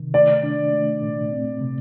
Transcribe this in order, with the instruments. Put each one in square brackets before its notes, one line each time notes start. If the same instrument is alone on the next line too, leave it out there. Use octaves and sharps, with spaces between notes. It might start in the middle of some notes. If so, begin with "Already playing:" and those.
Already playing: [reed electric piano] C3 D#3
[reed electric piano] A3 [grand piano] D5
[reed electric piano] D4
A3
A#2
C4
C3